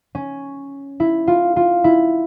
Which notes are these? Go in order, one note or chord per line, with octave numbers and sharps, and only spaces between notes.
C#4
E4
F4
F4
E4